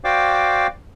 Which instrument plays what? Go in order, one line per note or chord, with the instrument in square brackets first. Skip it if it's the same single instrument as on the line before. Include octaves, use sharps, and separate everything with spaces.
[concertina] F#4 C5 D5 F5 G5 D6